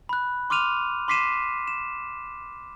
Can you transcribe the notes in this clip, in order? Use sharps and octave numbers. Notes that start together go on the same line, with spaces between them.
B5 F#6
C6 D6 F6 D#7 F7
C6 D6 B6 C7 D#7 E7
E7